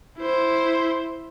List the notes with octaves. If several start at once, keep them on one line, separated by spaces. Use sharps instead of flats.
E4 C5